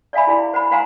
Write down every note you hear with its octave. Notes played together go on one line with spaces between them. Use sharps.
D5 E5 F5 G#5 B5
E4 G#4 C6
C5 F#5 B5
C5 F5 F#5 G#5 A#5 C6